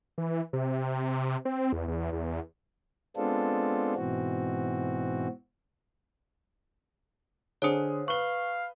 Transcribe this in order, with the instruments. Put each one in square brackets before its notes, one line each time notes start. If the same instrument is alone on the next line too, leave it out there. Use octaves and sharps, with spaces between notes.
[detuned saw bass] E3
C3
C4
E2
E2
E2
[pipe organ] G#3 B3 C4 D4 F4 A4
G#2 B2 E3 C4 F#4
[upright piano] D3 G#4 D#6 [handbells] C5 C#5
[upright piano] B4 G7 [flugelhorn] F5 [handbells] C#6